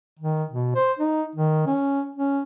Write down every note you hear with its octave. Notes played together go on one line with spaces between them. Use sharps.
D#3
B2
C5
D#4
D#3
C#4
C#4